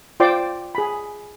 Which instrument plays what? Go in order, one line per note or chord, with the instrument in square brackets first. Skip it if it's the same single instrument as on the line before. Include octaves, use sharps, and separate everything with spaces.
[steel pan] F4 C5 D5 G5 C6 D6
G#4 B5